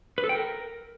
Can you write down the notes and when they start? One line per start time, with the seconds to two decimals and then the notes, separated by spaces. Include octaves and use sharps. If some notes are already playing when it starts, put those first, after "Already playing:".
0.18 B4
0.24 A4
0.29 G5
0.35 A#4